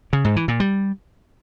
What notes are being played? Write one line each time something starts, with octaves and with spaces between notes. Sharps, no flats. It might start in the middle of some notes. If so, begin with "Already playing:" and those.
C#3
G#2
E3
A#2
G3